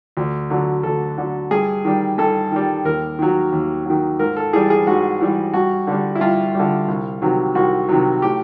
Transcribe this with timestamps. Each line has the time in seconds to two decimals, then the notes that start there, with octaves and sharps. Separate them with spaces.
0.17 D2
0.50 D3 F#3
0.83 D2 A4
1.18 D3 F#3
1.51 G2 G#4
1.85 D#3 G3
2.18 G2 A4
2.52 D#3 G3
2.85 D#2 A#4
3.19 D#3 F#3
3.52 D#2
3.85 D#3 F#3
4.19 G#2 A#4
4.37 A4
4.53 E3 G3 G#4
4.70 G#4
4.87 G#2 F#4
5.21 E3 G3
5.54 G2 F#4
5.87 D3 G3
6.15 E4
6.21 G2 F4
6.55 D3 G3
6.88 C2
7.22 C3 D#3 F#3
7.55 C2 F#4
7.89 C3 D#3 F#3
8.22 A2 G4